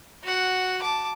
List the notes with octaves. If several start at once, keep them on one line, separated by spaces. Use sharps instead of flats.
F#4 F#5
A5 D6